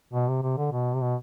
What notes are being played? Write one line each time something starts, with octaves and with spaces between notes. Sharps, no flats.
B2
C3
C3
D3
B2
C3
B2